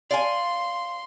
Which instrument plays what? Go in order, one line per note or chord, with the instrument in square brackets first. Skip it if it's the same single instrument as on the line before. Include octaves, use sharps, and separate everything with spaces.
[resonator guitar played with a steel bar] D5 F5 G#5 [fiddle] C6